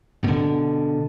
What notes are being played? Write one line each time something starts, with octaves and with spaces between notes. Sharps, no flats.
B2 D3